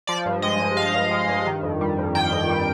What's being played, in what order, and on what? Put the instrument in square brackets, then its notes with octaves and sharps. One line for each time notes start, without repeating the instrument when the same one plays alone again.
[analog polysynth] F3 D5
G2
G#3 D#5
G2
F3 F5
G2
G#3
G2
D#3
F2
G3
F2
D#3 G5
F2
G3